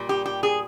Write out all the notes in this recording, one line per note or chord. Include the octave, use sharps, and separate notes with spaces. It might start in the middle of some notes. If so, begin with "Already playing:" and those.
Already playing: A#2 G3
G4
G4
G#4